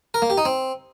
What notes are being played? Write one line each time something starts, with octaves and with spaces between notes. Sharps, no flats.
A#4
A#3
G4
D#4
C4